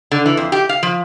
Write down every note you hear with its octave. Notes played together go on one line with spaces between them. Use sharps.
D3
E3
F2
G4
F5
F3